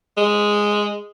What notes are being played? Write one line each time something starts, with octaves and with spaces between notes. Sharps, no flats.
G#3